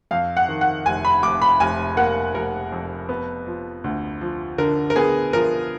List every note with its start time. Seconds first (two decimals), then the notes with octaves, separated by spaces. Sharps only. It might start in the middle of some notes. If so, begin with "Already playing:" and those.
0.11 F2 F5
0.37 F#5
0.49 D#3
0.61 F#5
0.86 F1 G#5
1.05 B5
1.23 F1 D6
1.42 B5
1.60 F1 G#5
1.97 A#3 F#5
2.35 F1 A#4
2.72 F2
3.09 B3
3.46 F3
3.84 D2
4.21 F3
4.58 D3 A#4
4.90 A#4
4.96 B3 G#4
5.33 F3 A#4